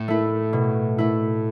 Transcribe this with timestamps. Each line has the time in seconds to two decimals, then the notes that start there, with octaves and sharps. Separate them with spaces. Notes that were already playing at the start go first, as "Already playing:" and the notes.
Already playing: A2
0.08 A3 E4
0.53 B2
0.98 A3 E4